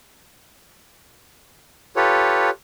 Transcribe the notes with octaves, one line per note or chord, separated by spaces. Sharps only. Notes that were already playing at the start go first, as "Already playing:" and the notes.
F4 G4 A4 B4 C#5